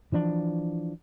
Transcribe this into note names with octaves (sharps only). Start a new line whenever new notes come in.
E3 F3 D4